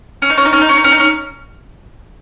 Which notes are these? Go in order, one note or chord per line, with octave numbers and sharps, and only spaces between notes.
C#4
D#4
C#4
D#4
C#4
D#4
C#4
D#4
C#4
D#4
C#4